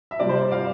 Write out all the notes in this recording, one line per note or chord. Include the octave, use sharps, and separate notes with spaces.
E5
C3 G3 C4 F4 D5
C5
D5
D5 F5